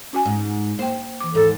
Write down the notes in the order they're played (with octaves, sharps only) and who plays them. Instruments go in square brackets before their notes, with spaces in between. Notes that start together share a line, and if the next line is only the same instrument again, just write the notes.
[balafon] C#4 F#4 G#5
[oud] G#2
[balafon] A#3 G5 [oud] C5
[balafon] E3 D6
[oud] D#2 G#2 [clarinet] A4